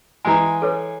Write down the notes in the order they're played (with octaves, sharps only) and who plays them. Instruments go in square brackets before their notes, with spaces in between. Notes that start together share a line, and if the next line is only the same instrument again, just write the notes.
[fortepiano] E3 G#3 [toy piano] G#5 A#5
[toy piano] A4 B4 C#5